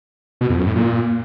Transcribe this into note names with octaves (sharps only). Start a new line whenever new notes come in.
B2
F2
F#2
A2
A#2